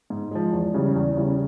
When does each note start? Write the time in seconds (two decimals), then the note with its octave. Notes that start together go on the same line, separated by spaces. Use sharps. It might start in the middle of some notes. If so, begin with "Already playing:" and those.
0.10 G#2
0.31 F3 G#3
0.52 E2
0.74 C#3 E3 G3
0.95 E2
1.16 C#3 E3 G3